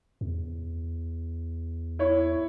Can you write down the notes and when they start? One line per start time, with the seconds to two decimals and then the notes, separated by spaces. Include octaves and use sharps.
0.21 E2
1.99 E4 C#5